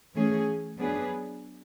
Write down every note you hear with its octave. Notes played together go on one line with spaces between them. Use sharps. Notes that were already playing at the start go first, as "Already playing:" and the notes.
E3 A3 C#4 G#4
F#3 B3 D4 G#4 B4